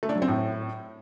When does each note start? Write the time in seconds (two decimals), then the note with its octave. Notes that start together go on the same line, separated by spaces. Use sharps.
0.03 A3
0.09 D4
0.15 F#3
0.22 C4
0.28 A2